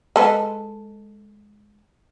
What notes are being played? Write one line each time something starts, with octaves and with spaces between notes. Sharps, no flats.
G#3 A4 B4